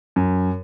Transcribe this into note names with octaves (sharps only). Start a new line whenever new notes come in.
F#2